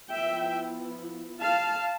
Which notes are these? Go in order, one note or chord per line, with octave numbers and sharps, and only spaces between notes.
F3 B3 E4 E5 G5
F5 A5